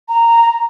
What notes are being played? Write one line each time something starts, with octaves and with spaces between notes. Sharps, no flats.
A#5